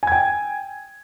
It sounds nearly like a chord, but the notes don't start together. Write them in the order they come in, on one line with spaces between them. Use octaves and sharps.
G#5 G#6 G5